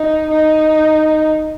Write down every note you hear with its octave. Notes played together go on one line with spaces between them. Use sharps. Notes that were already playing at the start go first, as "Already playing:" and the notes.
Already playing: D#4
D#4